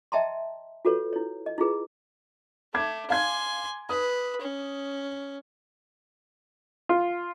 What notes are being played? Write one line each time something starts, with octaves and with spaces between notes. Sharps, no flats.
D#5 E5 G5 A5 A#5 C6
F4 F#4 A4 B4 C#5
E4 C#5
D#5
E4 F4 G#4 B4
A3 D6 G#6
F5 G#5 C6 G#6
B4 D#6
C#4
F4